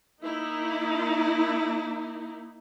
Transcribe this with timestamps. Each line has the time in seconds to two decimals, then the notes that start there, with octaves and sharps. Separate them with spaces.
0.23 A#3 D#4 E4